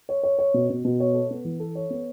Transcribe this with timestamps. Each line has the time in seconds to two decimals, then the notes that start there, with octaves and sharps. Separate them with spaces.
0.09 C#5
0.23 C#5
0.39 C#5
0.54 B2
0.70 B2
0.85 B2
1.00 C#5
1.14 A4
1.30 B3
1.45 E3
1.60 A4
1.75 C#5
1.90 B3